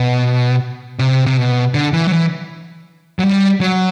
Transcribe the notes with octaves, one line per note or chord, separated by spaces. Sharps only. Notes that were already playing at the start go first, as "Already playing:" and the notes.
Already playing: B2
C3
C3
B2
D3
E3
F#3
E3
F#3
G3
F#3